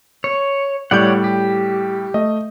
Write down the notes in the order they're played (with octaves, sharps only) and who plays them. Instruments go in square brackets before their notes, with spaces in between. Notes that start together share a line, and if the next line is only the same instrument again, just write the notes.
[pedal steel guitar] C#5
[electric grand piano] A2 G3 G6 [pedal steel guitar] C#5 D5 F#5
[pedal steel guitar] G4
[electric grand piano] A3 D#5